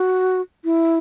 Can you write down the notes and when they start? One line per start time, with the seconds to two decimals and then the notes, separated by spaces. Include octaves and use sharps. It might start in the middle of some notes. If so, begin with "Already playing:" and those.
Already playing: F#4
0.65 E4